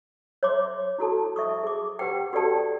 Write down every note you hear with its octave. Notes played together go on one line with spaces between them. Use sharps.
C#5 E5 C6 D6
E4 F#4 A4 A5
E5 C#6 D#6
G#4 D6
G4 B4 F#5 G5
F#4 G4 A4 D5 G5 A5